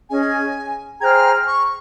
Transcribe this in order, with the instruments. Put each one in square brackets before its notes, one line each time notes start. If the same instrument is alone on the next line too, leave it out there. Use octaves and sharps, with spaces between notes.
[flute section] C#4 G#4 D#5 [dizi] G#5
[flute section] G#4 C5 G5 A#5 [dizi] F6 G#6
[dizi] C#6